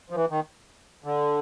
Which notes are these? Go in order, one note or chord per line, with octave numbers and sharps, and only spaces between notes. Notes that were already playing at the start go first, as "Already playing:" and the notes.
F3
E3
D#3
D3